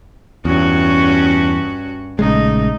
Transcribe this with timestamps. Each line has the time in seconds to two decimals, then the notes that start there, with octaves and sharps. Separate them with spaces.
0.45 E2 G2 C#4 F#4
2.19 A#1 C#3 G#3 A3 D#4